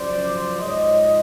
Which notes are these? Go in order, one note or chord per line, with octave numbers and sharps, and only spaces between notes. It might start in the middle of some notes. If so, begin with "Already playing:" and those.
Already playing: F#2 C#3 F3 C5 D5
G#2 F3 C#5 D#5